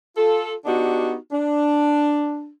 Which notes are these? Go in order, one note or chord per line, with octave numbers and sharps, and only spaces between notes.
F4 A4
B3 D4 D#4 F#4 G4
D4